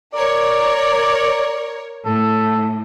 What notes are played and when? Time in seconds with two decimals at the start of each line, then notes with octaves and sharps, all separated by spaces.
0.14 A#4 C#5 D5
2.05 A2 A4